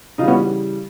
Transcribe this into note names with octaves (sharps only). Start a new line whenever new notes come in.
C#3 E3 G3 D#4 F4
B3 C#4